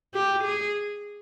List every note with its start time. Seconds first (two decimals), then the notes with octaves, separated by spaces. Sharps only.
0.14 G4
0.44 G#4